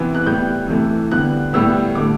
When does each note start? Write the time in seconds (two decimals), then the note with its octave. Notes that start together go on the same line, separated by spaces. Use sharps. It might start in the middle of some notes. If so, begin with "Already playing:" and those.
Already playing: C3 E3 B3
0.15 F#6
0.25 A2 G3 B3 G6
0.68 C3 E3 A3
1.11 D3 G3 B3 F#6
1.53 A2 G3 B3 E6
1.95 D3 A3 D6